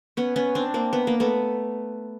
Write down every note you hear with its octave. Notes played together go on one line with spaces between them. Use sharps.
B3 C#4
B3 C#4
C4 D4
A#3 C4
B3
A#3
A3 B3